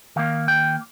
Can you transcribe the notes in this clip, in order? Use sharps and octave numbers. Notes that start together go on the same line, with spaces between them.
D#3 A#3 F5
G5